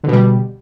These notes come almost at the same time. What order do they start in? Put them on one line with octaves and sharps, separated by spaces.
D3 B2 G3